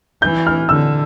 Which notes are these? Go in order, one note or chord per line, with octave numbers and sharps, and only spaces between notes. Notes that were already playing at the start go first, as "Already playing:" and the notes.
E3 G6
F6
D3 E6